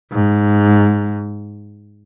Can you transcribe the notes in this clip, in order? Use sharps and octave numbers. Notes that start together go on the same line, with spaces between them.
G#2